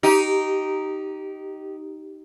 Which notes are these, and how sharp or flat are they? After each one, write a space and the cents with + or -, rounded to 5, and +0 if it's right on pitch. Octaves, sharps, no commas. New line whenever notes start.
D#4 +0 G4 -20